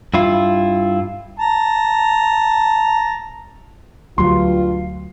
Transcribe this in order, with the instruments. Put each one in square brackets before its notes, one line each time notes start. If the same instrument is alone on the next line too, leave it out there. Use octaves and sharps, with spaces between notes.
[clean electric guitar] G2 E4 F4
[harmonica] A5 A#5
[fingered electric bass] D2 F#3 [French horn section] G2 F4 [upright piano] C6